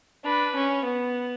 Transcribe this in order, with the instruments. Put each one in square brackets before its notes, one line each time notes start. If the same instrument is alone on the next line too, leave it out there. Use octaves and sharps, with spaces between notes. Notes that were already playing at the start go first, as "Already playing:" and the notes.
[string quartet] D4 [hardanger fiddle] B4
[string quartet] C#4
B3